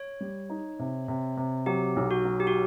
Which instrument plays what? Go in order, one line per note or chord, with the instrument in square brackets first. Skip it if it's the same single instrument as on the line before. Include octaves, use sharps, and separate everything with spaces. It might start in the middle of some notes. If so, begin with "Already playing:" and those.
Already playing: [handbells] C#5
[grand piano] G3
D#4
C3
C3
C3
[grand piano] F#3 [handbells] G4
[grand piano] B1
[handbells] F#4
[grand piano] F#3
[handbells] G4
F#4